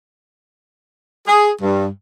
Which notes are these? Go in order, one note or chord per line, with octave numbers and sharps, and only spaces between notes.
G#4
G2